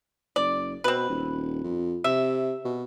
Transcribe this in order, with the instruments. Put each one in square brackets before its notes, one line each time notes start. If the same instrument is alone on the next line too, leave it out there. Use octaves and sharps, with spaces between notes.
[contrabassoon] F#1 [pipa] D5
[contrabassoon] B2 [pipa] C4 B4
[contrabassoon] D#1
F2
[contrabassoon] C3 [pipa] E5
[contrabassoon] B2